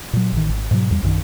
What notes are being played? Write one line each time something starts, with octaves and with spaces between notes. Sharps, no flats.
A#2 F#3
A1 D#3
G#1
G#2 B2 F3 F#3
E2 G3
A#1 F#2 D#3